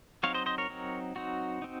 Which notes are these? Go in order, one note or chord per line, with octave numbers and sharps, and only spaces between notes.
F#3 C4 D#4 C#5 F5
C5 D#5
C5 D#5
A#4 C#5
F#3 C4 D#4
F#3 C4 D#4 F#4
C4 D#4